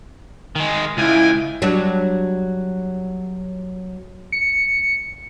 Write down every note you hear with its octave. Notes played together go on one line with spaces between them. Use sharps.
D#3 G#3
C#2 E4 G5 G#5
F#3 G3 D4
C#7